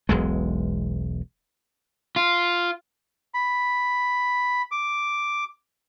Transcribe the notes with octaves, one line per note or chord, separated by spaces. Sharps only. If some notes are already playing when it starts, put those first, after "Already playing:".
E1 B1 G#3
F4
B5
D6